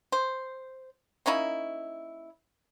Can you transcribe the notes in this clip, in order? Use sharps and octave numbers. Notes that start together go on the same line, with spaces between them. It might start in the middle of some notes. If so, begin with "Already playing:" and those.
C5
A#3 C#4 D#4 E4